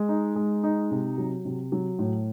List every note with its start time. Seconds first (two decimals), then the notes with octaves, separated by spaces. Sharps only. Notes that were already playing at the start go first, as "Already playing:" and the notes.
Already playing: G#3
0.09 D#4
0.36 G#3
0.64 D#4
0.91 C3
1.18 F#3
1.45 C3
1.72 F#3
1.99 A2